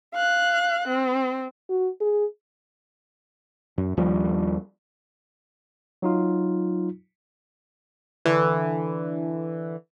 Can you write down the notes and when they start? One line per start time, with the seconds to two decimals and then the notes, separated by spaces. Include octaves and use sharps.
0.14 F5 F#6
0.88 C4
1.70 F#4
2.01 G#4
3.78 F#2
3.97 D#2 F3 G3
6.02 F#3 D#4 F4
8.26 D3 E3